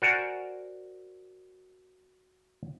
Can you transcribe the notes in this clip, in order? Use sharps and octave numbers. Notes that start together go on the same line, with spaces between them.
F#4 A#4 C5 D5 F#5 G#5